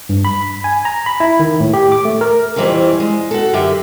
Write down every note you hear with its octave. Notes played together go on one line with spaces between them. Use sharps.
G2
B5
G#5
A#5
B5
E4
D#3
A2
G4
D6
A3
A#4
F2 E3 G3 C4 C#4
G#3
F#4 A4
F#2 D3 G4 E5